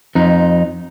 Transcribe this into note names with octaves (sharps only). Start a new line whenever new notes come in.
F2 D#4